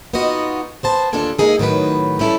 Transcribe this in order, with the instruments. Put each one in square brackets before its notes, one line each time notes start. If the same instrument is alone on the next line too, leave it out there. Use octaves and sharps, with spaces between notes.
[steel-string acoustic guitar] B3 D#4 F4 F#4 D#5
B3 C5 A5
D#2 D3 D4 F4 A4 G#5
G#3 A#3 D#4 G#4 A4
A2 D#3 F#3 D#4 B4
G3 C#4 E4 G#4 A4